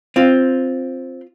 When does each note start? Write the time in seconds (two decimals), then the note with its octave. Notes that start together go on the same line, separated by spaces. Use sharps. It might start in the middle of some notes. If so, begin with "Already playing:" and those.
0.16 C4 F4